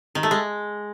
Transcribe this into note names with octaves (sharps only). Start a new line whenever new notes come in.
D#3
A3
G#3